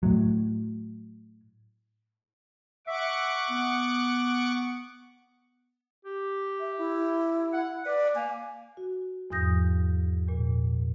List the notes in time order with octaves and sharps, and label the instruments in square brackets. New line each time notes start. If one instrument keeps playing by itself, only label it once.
[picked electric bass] A2 F#3
[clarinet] E5 [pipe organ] F#5 C#6 D6
[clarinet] B3
G4
[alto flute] E5
E4
[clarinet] F#5
[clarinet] B4 [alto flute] D5
[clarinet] A#3 [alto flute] G#5
[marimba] F#4
E2 G#2 F3 D#6 G6 A#6
E2 A#2